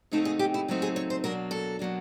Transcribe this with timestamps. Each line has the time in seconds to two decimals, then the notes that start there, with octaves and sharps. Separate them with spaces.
0.12 C#3 F#3 A3 C4 D#4 A4
0.25 G#4
0.39 G4
0.54 E4
0.68 C#3 F#3 A3 C4 D#4
0.82 G#4
0.96 C#5
1.10 C5
1.24 B2 F#3 A#3 D4 A#4
1.51 A4
1.79 B2 F#3 A#3 D4